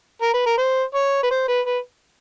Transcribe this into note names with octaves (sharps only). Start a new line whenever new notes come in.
A#4
B4
A#4
C5
C#5
B4
C5
B4
B4